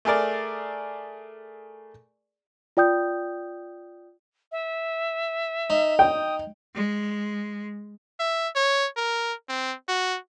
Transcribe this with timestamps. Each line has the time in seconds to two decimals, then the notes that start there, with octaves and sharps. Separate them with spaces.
0.05 A3 G#4 A#4 D5
2.77 F4 D5 G5 D#6 G6
4.52 E5
5.70 D#4
5.99 G5 D#6
6.75 G#3
8.20 E5
8.56 C#5
8.97 A#4
9.49 C4
9.88 F#4